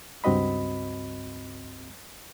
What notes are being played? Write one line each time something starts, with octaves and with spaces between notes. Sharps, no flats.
C#2 G2 C4 F#4 D#5 B5